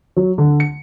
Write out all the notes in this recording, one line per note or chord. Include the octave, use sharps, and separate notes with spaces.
F#3
D3
C#7